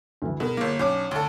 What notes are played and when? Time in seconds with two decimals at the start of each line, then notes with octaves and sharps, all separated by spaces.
0.22 D2 E3
0.40 B2 G#4 A#4
0.57 G1 A#3
0.79 B1 C#4 D4 C#5 D6
1.11 D2 A4